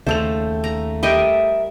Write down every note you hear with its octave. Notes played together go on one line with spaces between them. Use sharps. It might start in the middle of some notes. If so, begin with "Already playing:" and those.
D#2 C#3 A3 A4 C5 E6 F7
A#5
G3 A#4 D#5 E5 G5